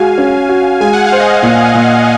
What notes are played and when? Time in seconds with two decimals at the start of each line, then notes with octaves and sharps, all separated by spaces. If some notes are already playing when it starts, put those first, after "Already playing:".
Already playing: G#3 F#4 F5 G#5
0.18 C#4
0.49 F#4
0.80 G#3 G#5
0.93 F#5
1.07 F5
1.12 C5
1.19 D#5 F#5
1.43 A#2
1.74 A#2